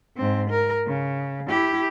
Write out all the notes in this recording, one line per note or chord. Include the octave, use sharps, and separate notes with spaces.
G#2 C4
A#4
C#3
E4 G4